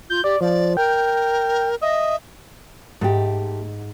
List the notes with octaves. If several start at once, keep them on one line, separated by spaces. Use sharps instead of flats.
F4 G6
G4 D5
F3 D5
A#4 G5
D#5 E5
G#2 A3 G4